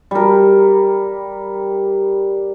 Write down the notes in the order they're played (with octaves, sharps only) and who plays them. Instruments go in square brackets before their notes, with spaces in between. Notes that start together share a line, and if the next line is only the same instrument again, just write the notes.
[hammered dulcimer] G3 A#4